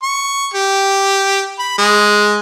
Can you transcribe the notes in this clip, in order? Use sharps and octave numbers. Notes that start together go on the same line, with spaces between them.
C#6
G4
B5
G#3